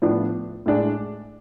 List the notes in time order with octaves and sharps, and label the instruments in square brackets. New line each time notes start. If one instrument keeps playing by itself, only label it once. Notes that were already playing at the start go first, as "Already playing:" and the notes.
[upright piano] A2 F3 B3 D4
A2 G#3 D4